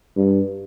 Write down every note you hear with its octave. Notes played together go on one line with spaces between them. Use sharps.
G2